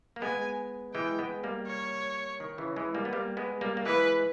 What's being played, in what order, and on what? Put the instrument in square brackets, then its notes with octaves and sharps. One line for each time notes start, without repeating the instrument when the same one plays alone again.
[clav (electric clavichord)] A#3
[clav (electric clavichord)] G#3 B3 [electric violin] G#5
[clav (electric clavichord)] E3 G#3 [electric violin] G5
[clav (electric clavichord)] G#3 B3
G3 A#3
[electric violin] C#5
[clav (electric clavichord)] D#3
C#3 E3
E3 G#3
G3 A#3
B3
G3 A#3
G#3 B3
G3 A#3
A#3
[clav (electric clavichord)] E3 G#3 [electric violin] B4